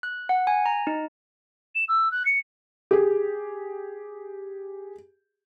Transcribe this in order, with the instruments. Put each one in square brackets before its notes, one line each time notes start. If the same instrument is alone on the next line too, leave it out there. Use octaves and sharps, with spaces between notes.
[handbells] F#6
F#5
G#5
A#5
D#4
[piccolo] E7
E6
F#6
C#7
[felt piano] G4 G#4